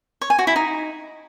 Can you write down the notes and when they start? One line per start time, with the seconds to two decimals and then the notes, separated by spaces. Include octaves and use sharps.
0.21 C#5
0.30 G#5
0.39 F#4
0.47 E4
0.56 D#4